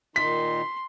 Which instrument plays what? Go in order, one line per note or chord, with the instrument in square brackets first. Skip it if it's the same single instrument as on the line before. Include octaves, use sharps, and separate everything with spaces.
[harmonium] A#2 D#3 D#4 [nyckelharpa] C6 [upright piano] B6